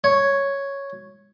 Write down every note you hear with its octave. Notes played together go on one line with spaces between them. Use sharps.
C#5